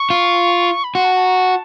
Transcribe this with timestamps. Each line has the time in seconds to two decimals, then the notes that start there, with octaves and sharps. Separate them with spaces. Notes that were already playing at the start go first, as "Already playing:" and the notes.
Already playing: C#6
0.10 F4
0.84 B5
0.95 F#4 C6
1.05 A5
1.16 A5
1.26 A#5
1.36 A5